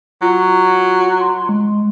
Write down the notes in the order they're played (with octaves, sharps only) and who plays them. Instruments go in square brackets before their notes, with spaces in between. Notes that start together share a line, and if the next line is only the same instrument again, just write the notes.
[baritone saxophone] F#3 [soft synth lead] F4
[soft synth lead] C6
G#3